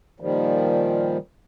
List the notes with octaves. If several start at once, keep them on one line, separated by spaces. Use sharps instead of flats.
A#2 D#3 F3 G3